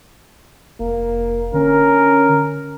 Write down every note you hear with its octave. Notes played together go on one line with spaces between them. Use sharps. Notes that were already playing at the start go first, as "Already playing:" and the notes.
F1 A#3
D3 C#4 A#4